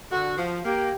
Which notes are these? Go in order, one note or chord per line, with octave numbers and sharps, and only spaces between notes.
D3 F#4
F3
A#3 G4